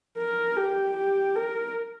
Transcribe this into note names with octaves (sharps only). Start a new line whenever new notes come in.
A#4
G4
G4
A#4